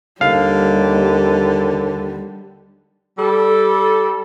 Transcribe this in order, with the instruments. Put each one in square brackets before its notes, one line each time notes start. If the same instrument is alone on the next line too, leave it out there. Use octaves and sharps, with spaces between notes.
[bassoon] D#2 [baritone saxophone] D3 [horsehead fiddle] G3 [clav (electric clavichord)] F5
[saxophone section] G3 A4